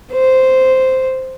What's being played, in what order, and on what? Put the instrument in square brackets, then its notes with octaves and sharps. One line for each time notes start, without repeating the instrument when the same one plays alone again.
[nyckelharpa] C5